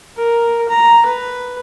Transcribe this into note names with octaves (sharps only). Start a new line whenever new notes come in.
A#4
A#5
B4